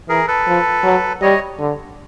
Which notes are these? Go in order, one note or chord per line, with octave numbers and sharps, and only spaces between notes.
E3 G#4 A#4
A4 B4
F3
F#3
G3 C#5 D#5
D3